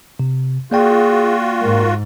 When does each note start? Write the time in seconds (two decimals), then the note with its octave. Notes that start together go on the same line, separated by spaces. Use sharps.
0.20 C3
0.71 A#3 F4 F#4 G#4 D5 G5
1.61 G#2 A#4